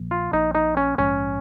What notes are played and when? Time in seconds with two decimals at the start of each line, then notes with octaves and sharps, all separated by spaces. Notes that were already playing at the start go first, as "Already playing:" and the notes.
Already playing: A#1 A#2 F3 A#3
0.11 F4
0.33 A#1 A#2 F3 A#3 D#4
0.55 D#4
0.77 C#4
0.98 A#1 G#2 F3 G#3 C#4